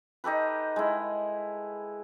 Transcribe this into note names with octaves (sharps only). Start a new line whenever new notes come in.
D#4 G4 A4 B4
G#3 E4